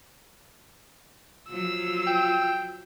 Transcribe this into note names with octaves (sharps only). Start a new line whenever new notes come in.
F3 F#3 F4 E6
G5